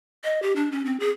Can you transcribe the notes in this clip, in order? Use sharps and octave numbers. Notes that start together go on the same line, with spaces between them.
D#5
G4
D4
C#4
C4
G#4